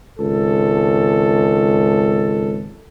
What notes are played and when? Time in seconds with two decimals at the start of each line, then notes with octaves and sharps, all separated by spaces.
0.19 G#1 C#2 A4